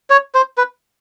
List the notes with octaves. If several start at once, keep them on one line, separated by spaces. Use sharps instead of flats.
C#5
C5
B4